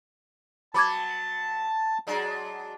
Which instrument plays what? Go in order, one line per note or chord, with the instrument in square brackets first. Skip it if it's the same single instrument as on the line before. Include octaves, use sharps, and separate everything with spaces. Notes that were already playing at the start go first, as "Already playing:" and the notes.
[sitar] F#3 B3 [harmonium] A5 [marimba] B5 D6 G#6
[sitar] F#3 G#3 D4